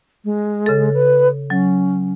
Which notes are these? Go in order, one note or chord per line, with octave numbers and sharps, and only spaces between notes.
G#3
C#3 A4
B4
F#3 C#4